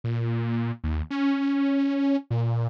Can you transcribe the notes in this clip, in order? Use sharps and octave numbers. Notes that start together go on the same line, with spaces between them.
A#2
D#2
C#4
A#2